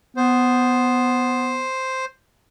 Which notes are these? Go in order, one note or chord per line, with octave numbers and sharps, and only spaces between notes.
B3 C5